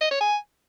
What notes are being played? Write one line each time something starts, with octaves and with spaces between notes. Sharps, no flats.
D#5
C#5
G#5